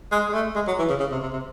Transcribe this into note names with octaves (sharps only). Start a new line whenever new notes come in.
G#3
G#3
A3
G#3
F#3
E3
C#3
C#3
C3
C3
C3